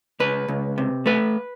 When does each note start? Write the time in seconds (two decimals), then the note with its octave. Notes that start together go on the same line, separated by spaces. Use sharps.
0.20 C#2 B4
0.48 C#2
0.78 C3
1.06 A3 B4